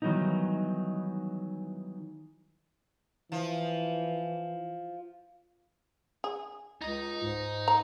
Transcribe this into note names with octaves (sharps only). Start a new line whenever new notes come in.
D#3 E3 F#3 G3 B3 D#4
E3 F3
G#4
C#2 D#4 D#5
G#2
A#5